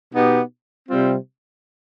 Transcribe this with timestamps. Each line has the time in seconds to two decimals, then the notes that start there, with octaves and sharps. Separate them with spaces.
0.13 B2 B3 D#4 G4
0.89 C3 G3 C4 F4